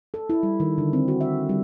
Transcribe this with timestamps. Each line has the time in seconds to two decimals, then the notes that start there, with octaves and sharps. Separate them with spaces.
0.14 A4
0.30 E4
0.43 G3
0.60 D#3
0.78 D3
0.93 C4
1.08 F#4
1.21 E5
1.49 G3